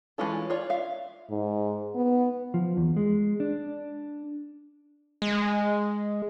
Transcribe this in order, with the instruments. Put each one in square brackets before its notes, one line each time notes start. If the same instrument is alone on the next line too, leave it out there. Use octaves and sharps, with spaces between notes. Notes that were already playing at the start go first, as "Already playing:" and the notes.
[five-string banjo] E3 G#3 C#4 F4 A4
F4 C#5 D5
E5 F5
[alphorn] G#2
B3
[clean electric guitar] F3
E2
G#3
D4
[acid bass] G#3